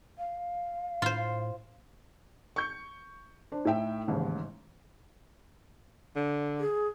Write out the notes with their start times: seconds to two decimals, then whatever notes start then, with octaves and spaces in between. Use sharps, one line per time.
0.19 F5
1.02 A2 F4 C5
2.56 C#6 G6 C#7
3.52 D4 C5
3.65 A2 D#4 E5 G5
4.08 A1 D#2 G#2 C#3
6.16 D3
6.60 G#4